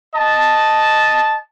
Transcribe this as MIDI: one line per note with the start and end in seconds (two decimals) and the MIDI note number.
0.15 1.38 75
0.15 1.38 81